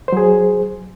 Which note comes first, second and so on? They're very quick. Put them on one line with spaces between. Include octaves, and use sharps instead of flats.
C5 F#3 G#4